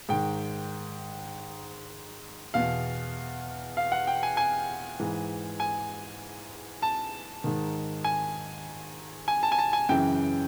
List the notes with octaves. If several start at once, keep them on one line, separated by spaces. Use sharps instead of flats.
G#2 D#3 G5
E2 B2 F5
F5
F#5
G5
G#5
G#5
G#2 E3
G#5
A5
G#2 D#3
G#5
G#5
A5
G#5
A5
G#5
F#2 C#3 E3 G5